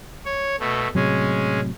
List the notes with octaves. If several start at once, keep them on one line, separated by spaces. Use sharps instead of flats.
C#5
B2 A3
A2 C3 F#3 G#3 C#4